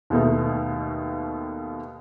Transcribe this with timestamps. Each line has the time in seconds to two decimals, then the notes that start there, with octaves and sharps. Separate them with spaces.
0.10 D#2 B2 D#3 A3 B3 D#4